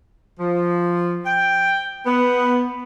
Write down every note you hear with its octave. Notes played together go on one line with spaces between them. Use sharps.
F3
G5
B3